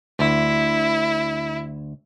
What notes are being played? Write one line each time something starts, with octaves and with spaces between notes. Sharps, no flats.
D2 E4